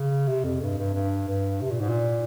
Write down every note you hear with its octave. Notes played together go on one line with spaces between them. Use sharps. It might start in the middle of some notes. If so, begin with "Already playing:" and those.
Already playing: C#3
C3
F2
G2
G2
G2
G2
C3
A#2
G#2
A#2